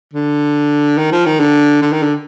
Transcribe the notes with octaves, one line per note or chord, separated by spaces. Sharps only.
D3
D#3
F3
D#3
D3
D3
D#3
D3